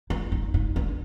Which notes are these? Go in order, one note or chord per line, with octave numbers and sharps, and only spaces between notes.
E4
D#4
D#4
D4